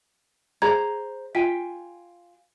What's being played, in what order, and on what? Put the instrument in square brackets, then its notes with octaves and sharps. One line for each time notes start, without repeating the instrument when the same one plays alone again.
[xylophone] G#4 G#6 [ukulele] C5 A#5
[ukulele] F4 G5 G#5 [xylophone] B6